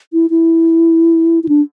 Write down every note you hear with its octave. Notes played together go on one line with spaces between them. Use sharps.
E4
E4
E4
D4